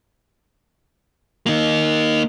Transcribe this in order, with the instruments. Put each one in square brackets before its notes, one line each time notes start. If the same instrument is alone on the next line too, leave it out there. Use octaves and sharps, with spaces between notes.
[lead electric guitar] A#3 D#4